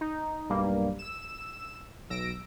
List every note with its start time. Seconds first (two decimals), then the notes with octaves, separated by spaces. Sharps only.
0.01 D#4
0.49 B1 G2 G3 A#3
0.99 E6 E7
2.10 B1 E6 A#6 D7